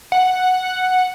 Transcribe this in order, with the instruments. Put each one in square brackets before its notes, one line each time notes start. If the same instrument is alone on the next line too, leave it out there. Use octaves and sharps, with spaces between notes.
[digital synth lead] F#5